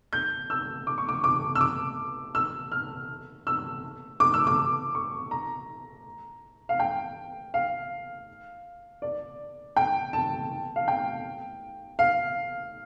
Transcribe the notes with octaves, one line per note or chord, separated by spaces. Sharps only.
G6
E6
D6
C#6
D6
D6
E6
D6
E6
F6
E6
D6
E6
D6
C#6
A#5
F5
G5
F5
D5
G5
A5
F5
G5
F5